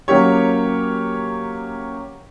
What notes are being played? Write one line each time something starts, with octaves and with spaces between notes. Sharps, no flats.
F#3 A#3 C#4 G4 C#5